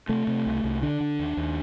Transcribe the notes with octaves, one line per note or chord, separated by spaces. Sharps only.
C3 A3
C3
C2
C2
D3 D4
D3
D#2
D#2